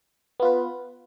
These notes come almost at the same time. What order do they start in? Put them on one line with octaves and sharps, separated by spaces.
B3 F4 B4